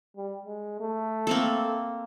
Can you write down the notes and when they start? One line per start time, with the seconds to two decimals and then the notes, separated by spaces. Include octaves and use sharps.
0.17 G3
0.45 G#3
0.80 A3
1.27 A#3 C4 A4